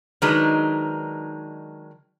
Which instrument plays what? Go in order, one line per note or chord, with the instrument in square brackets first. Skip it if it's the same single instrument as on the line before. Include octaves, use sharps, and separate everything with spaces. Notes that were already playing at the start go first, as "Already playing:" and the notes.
[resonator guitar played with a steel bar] D#3 F#3 G#3 D4 D#4 B4